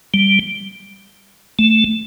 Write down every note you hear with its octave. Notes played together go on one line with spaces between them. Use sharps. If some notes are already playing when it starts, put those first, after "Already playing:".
G3
A3